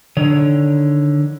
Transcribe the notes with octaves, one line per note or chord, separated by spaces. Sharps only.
D3 D#3 C#5